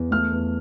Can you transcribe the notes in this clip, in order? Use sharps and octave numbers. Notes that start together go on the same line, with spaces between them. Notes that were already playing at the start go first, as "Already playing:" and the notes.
Already playing: E2
A3 F6
E2